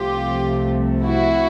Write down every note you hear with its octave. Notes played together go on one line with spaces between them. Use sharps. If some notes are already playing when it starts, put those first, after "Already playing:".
Already playing: C2 C3 F3 A3 F4 G4
E4 F#4